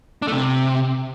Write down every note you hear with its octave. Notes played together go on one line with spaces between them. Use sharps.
D4
A3
C3